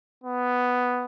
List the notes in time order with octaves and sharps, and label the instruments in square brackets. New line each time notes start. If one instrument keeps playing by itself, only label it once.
[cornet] B3